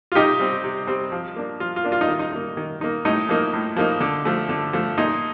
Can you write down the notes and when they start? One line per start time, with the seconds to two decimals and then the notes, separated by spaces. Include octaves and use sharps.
0.12 F4
0.15 C3 D#4 G4
0.39 G3 C4
0.64 C3
0.87 G3 C4
1.12 F3
1.36 A#3 D4
1.60 F3 F4
1.76 F4
1.84 A#3 D4
1.92 F4
2.01 D#4
2.08 D#3
2.19 D#4
2.32 A#3 D#4
2.57 D#3
2.81 A#3 D#4
3.05 A2 D#4
3.29 F3 A#3 D#4
3.53 A2
3.76 F3 A#3 D#4
4.00 D3
4.25 F3 A3
4.49 D3
4.73 F3 A3
4.98 A#2 D#4